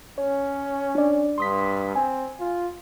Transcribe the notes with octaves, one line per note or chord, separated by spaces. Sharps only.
C#4 C#5
D4 D5
G2 C6 D#6 B6
C4 G#5
F4